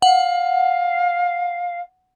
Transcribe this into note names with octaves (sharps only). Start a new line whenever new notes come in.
F5 F#5